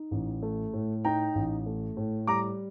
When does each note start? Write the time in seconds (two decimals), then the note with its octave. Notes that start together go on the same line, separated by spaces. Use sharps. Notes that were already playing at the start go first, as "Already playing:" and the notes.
Already playing: D#4
0.11 A1
0.42 A3
0.73 A2
1.05 D#4 G5 A#5
1.35 A1
1.66 A3
1.97 A2
2.27 G3 A#5 D6